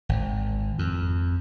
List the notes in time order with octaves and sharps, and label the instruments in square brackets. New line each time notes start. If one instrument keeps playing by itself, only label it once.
[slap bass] G#1
F2